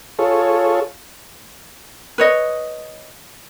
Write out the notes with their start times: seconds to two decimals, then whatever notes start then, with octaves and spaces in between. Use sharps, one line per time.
0.19 F4 G#4 A4 C#5
2.18 B4 C#5 D#5